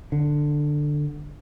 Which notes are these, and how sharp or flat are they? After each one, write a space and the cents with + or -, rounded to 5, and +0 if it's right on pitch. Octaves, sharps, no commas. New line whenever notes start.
D3 +10